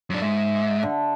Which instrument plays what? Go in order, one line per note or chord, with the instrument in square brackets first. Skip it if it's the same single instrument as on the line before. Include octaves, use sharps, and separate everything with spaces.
[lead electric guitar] F#2 D4
[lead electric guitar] G#2 [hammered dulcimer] E5
[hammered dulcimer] D3